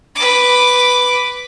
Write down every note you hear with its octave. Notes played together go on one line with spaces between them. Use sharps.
B4 D6